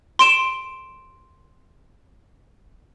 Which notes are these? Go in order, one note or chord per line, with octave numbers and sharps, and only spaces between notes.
C6 D7 E7